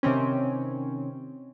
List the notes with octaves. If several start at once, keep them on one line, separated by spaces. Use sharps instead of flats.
C3 D#3 C4 C#4